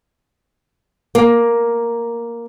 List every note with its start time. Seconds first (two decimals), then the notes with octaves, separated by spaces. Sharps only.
1.15 A#3